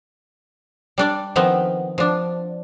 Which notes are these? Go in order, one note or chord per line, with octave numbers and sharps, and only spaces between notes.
G3 D4 D5
D#3 F3 B3 C4
F3 D4